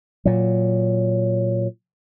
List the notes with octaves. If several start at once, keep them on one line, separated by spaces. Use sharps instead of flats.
A#2 F#3